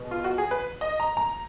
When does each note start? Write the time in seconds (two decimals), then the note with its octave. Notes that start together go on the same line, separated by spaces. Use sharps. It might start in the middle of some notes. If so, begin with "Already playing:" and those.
Already playing: B2 G#3 B3
0.11 F4
0.24 F#4
0.38 G#4
0.51 B4
0.81 D#5
1.00 A#5
1.17 A#5